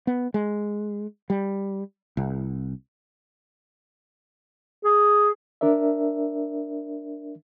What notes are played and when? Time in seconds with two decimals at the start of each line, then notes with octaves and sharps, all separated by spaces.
0.07 B3
0.34 G#3
1.30 G3
2.17 C2
4.85 G#4
5.61 D4 A#4 D5 E5